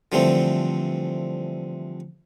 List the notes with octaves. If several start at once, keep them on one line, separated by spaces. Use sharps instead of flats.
D3 E3 F3 G3 A3 C4